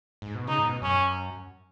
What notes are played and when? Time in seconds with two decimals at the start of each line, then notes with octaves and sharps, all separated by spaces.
0.22 G#2
0.35 B2
0.47 C#3 D#4
0.59 G#2
0.65 B2
0.82 F#2 C#4